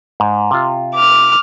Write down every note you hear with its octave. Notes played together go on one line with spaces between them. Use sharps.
G#2
C3 F4
D6 F6